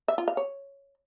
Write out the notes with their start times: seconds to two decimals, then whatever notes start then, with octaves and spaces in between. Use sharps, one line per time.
0.08 E5
0.18 F4
0.28 F5
0.37 C#5